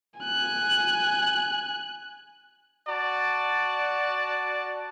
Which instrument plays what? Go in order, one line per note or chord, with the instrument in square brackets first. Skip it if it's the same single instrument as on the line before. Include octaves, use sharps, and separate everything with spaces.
[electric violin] G#5 F#6
[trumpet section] F#4 D5 A5